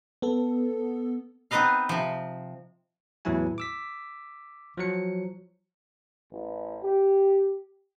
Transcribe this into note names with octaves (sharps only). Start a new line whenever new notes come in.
B3 A4
B3 C4 D#4 B4 D#5 F5
C3 F3
E2 A2 E3 F#3 E4 G#5
D6 E6 B6
F3 F#3 C#7
A1
G4